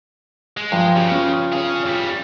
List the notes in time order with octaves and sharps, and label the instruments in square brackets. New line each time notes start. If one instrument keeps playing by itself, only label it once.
[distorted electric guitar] G#3
[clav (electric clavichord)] G2 [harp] F3
[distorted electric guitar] C#3 [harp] G4
[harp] C#4 F4
[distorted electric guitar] C#4 G#4 [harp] F5
[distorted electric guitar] F2 G3 [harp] E6